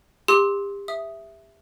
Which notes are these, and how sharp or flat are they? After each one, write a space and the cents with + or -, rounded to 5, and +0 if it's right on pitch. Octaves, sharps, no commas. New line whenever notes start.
G4 +35 C6 +10 E6 -30
E5 +0 D#6 +0